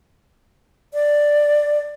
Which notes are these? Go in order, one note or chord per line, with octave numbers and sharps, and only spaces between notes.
D5